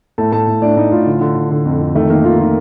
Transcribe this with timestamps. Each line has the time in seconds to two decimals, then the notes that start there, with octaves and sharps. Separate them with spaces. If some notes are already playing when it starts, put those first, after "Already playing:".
0.18 A2 A4 A5
0.32 A2 A4 A5
0.47 A2
0.62 A2 D4 D5
0.77 A2 D#4
0.92 A2 F4
1.06 D3
1.21 D3
1.36 D3
1.51 D3
1.66 F2
1.81 F2
1.95 D#3 A3 A4
2.10 D#3 A#3 A#4
2.25 D#3 F4
2.39 D#3 F4